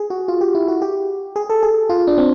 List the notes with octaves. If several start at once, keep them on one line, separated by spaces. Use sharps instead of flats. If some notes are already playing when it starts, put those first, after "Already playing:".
Already playing: G#4
F#4
F4
G4
E4
F#4
G4
G#4
A4
G#4
F4
D4
C4